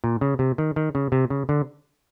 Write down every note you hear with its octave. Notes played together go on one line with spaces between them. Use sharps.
A#2
C#3
C3
D#3
D#3
C#3
C3
C#3
D3